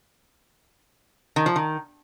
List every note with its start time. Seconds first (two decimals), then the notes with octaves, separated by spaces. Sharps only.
1.36 D#3
1.46 F3
1.56 D#3